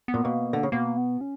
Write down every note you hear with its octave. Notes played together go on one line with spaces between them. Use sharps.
B3
A#2
B2 A#3
D3
C#3
B2 A#3
B3
C#4